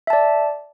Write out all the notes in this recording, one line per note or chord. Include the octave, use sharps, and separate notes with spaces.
D5 E5 A5